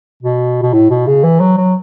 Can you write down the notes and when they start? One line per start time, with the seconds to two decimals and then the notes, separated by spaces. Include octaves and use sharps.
0.23 B2
0.62 B2
0.73 A2
0.90 B2
1.07 C#3
1.24 E3
1.40 F#3
1.57 F#3